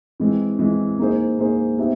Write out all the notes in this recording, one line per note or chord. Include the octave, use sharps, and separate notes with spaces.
E3 G#3 C4
E3 G#3 C4
A#3 D#4 G#4 C5
A#3 D#4 G#4 C5
B3 D#4 G4 C5 E5